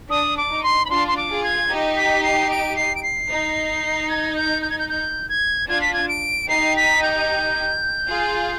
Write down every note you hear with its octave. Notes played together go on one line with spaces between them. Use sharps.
D4 D#6
D6
D#4
C6
B5
D4 F4 C6
C6
D6
F4 G#4
G#6
D#4 G4
B6
C7
D7
C7
D7
C7
D#4
G#6
G6
G6
G#6
G6
G6
G#6
D4 F4 G#6
B6
G#6
D7
D#4 G4 C7
B6
G6
F4 G#4